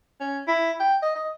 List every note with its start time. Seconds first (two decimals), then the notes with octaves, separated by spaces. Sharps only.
0.20 C#4
0.48 E4
0.80 G5
1.02 D#5
1.15 D#5